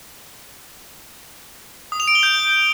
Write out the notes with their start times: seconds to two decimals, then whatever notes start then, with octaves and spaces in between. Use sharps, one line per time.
1.92 D#6
2.00 F7
2.08 D7
2.15 G7
2.23 G6